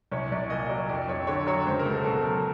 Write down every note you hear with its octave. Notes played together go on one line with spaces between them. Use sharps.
C2 C#5
C2 D5
A#2 D#5
F#3 D5
F2 D5
F2 C#5
D3 C#5
F#3 C#5
C#2 C5
A#4
C#2
A4
B2 A4
F#3 A#4